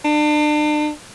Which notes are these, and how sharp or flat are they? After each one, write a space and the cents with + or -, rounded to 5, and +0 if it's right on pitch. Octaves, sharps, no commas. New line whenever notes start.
D4 +35